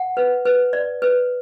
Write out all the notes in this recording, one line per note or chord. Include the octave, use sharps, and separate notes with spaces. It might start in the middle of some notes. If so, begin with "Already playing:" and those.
Already playing: F#5
B4
B4
D5
B4